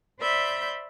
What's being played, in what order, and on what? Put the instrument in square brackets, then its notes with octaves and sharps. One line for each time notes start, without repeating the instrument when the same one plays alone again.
[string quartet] C5 D5 E5 B5 G6